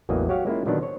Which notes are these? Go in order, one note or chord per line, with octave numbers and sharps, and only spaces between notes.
A1 E2 E3 F#3 A#3 D#5
F#3 F#4 G4 C#5 F5
G#3 A#3 C#4 E4 F4
A#2 D3 D#3 F#3 B3 D4
C5 C#5